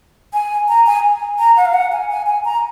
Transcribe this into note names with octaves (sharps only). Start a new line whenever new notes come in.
G#5
A#5
G#5
A#5
F#5
F5
F#5
G#5
G#5
G#5
A#5